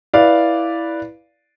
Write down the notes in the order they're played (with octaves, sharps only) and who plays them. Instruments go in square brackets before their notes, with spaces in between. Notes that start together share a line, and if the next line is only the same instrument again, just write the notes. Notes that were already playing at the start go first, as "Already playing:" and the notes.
[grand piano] E4 B4 D5 F5